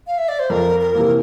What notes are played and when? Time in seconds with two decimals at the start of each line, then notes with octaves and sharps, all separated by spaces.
0.07 F5
0.18 E5
0.29 D5
0.39 C5
0.50 F2 A#4
0.80 A#4
0.95 C3 E3 A#3